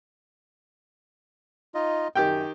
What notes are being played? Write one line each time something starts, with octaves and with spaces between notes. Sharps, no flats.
D#4 F4 D#5
F#2 D#3 G4 G5